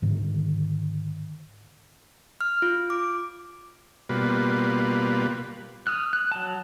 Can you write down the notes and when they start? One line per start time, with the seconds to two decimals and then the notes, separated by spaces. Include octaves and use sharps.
0.02 G#2 D3 D#3
2.41 F6
2.62 F4
2.90 D6
4.09 B2 G3 A#3 F4 B4
5.87 D#6 F6 F#6
6.13 F#6
6.32 F#3 A5